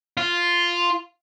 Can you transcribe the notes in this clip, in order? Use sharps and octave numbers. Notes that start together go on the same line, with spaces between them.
F4